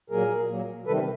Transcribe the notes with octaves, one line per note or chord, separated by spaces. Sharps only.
A#2 F#3 A#3 G#4 A#4
A#2 F#3 A#3
C3 D#3 G3 A4 B4